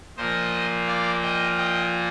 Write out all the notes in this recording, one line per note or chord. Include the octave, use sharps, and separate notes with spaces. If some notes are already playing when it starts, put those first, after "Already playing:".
A#2 F3 A#3 C5 D#5
D5 F5
D#5 G5
D#5 G5